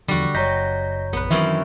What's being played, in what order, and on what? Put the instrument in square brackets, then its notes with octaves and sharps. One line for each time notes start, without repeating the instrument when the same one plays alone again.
[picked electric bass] E2 F3 [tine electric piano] D3 [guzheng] G3 F#4
[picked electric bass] F#1 [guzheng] F#3 [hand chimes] C#5 A#5 G6 [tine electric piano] D#5 A#6 B6
[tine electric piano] A#1 [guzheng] B3 B4
[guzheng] F#2 C4 C#4 [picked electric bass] D#3 [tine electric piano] E3 F#3 [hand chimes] E5